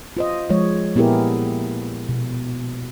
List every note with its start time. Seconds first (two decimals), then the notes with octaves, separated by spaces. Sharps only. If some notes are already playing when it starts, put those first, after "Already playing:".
0.17 F4 C5 D#5
0.50 F3 G#3 C#5
0.95 A#2 B3 E4 G4 G#4 A#4
2.09 B2